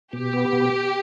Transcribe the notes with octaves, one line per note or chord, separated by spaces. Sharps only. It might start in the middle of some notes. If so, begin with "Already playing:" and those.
B2 G4
B3
B2